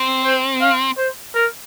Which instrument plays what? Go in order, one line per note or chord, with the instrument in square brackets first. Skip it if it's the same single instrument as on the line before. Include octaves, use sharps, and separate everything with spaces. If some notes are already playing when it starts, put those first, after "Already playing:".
Already playing: [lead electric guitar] C4
[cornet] C5
F5
C5
A#4